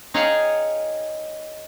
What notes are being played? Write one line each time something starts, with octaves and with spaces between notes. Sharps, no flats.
D#4 G#4 C#5 F5 G5